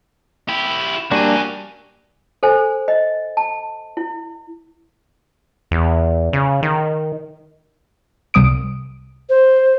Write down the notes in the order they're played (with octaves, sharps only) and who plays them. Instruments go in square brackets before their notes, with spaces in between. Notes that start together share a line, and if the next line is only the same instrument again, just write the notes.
[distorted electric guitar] E4 G4
[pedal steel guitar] G3 A#3 D4 [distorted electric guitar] F#4 G#5
[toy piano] A4 C5 G#5
D#5
A5
E4
[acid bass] E2
C#3
D#3
[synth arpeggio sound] C2 D#6 D7
[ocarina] C5